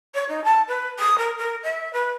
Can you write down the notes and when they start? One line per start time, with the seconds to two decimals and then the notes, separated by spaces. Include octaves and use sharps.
0.14 C#5
0.29 D#4
0.44 A5
0.68 B4
0.99 D#6
1.18 A#4
1.38 A#4
1.63 E5
1.93 B4